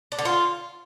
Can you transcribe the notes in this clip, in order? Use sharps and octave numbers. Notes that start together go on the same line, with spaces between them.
D4
D3
F4